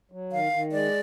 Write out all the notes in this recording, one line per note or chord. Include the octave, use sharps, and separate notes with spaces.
F#3
D#3 F5
D#3
G#3 D5